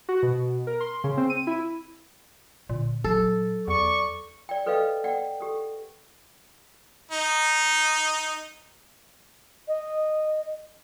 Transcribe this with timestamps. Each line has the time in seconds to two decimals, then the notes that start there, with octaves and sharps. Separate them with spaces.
0.09 F#4
0.23 B2
0.67 A#4
0.81 C6
1.04 C#3
1.17 C4
1.30 D#7
1.47 E4
2.70 A#2 D3
3.04 F#3 A4
3.68 E2 D5 C#6
4.49 D5 G5
4.66 A4 B4 D5 D#5 F5 G5
5.04 D5 F#5 G5
5.40 G4 A4
7.11 D#4
9.68 D#5